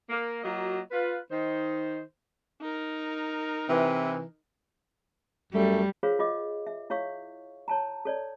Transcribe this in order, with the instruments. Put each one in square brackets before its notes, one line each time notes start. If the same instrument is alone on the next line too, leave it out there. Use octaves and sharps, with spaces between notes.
[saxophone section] A#3
F#3 A#3 F4 F#4 D#5
F4 B4
D#3 D#4 C5
[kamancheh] D#4 A#4
[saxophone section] C3 E3
[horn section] F#2 A3 [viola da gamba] G3
[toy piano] F4 G#4 A#4 C5 C#5 F5
F4 D#5 D6
E5
E4 C#5 F5 C#6
C#5 A5 A#5
A4 C#5 D5